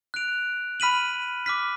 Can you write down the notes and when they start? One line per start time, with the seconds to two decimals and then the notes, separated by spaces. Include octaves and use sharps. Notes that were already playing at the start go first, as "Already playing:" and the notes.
0.14 F#6 D7 F7
0.80 B5 F6 B6 D#7 F#7
1.46 D6 F6 B6